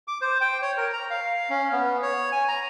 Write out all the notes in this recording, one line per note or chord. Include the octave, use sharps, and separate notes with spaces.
D6
C5
G5
C#5
A#4
A#5
F5
C#4
B3
C#5
G#5
A#5